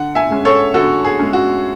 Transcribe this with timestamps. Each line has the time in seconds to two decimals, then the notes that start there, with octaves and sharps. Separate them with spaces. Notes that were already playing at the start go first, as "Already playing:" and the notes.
Already playing: D3 F#5
0.15 E5 G#5
0.31 G#3 C#4
0.45 A4 C#5
0.74 D3 F#4 A4
1.04 G#4
1.19 G#3 C#4
1.33 F#4